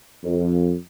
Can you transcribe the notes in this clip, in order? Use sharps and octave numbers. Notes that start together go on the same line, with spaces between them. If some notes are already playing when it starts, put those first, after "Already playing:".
F2